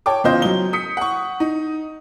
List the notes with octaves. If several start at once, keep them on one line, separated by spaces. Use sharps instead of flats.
C#5 G5 A5 D6
E2 C#3 F4 C5 D#5 G6
F#3 G7
D#6 B6 C#7
F#5 C#6
D#4